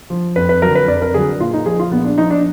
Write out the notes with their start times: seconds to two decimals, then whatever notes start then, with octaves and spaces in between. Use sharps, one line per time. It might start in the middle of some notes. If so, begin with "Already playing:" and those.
0.10 F3
0.36 F2 B4
0.49 B4
0.62 D3 F#3 A#4
0.75 B4
0.88 F2 D5
1.02 A#4
1.14 D3 F#3 G#4
1.40 A#2 F4
1.54 D#4
1.66 F3 G#4
1.79 F4
1.91 A#2 B3
2.05 D4
2.18 F3 D#4
2.30 D4